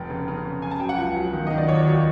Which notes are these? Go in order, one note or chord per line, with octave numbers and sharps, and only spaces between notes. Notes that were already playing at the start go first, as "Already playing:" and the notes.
Already playing: F1 G5
C#3
C#3
C#3
C#3 G#5
A5
F#3 G5
F#5
C#2
F#3
D#3
D#3 D#5
D5
D#2 C#5
F#3